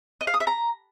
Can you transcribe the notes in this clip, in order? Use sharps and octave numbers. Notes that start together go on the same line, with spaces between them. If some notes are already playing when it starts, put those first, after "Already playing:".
D#5
F5
D#6
E5
A#5